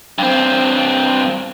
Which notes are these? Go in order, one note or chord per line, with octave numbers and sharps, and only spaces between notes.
G2 C4